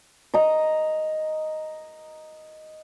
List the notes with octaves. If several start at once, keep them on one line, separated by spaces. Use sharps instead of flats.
D#5 A#5